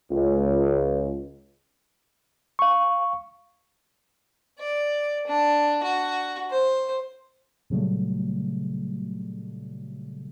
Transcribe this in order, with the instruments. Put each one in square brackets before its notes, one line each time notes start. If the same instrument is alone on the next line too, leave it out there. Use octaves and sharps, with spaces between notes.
[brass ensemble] C#2
[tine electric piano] F5 C#6
[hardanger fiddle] D5
D4
F#4
C5
[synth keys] A#2 C#3 F#3 G3 A3